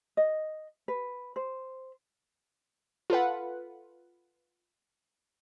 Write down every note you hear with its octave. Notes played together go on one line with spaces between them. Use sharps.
D#5
B4
C5
F4 A4 B4 F#5